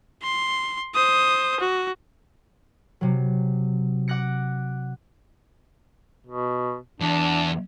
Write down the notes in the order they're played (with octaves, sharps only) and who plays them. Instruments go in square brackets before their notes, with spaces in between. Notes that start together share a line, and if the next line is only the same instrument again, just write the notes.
[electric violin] C6
C5 D#6
F#4
[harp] C3 F#3
F#5 D6 F#6 A#6 C#7
[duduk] B2
[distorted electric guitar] E2 [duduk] D4